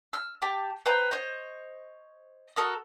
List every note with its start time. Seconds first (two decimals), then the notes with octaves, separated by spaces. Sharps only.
0.13 E6 F6
0.42 G4 G5 A5 D6
0.86 B4 C5 G5 A#5
1.11 C5 C#5 D#5
2.56 F#4 A4 A#4 D#6